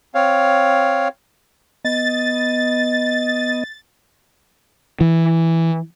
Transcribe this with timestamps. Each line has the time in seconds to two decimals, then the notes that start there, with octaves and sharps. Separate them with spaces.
0.15 C4 C#5 F5
1.85 B3 D#5 A6
5.01 E3